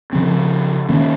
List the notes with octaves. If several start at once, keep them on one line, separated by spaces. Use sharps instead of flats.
C#3 F3 C4
D#3 A#3 C#4